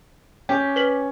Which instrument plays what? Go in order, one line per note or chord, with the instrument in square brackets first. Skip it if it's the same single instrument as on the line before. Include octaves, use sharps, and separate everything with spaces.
[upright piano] C#4 [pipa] G4
[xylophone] B4 B6 F#7